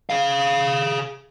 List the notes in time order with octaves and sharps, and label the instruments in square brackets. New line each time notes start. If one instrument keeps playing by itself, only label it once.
[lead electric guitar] G#4 F5